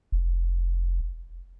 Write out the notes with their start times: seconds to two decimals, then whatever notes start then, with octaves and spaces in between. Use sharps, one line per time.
0.12 F1